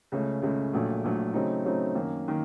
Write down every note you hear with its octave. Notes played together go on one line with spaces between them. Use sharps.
C#2 C#3 A3 C#4
C#2 C#3 A3 C#4
A#1 A#2 F#3 A3
A#1 A#2 F#3 A3
C#3 F#3 A3 C4 D#4
C#3 F#3 A3 C4 D#4
F#2 D#3 A#3
D#3 A#3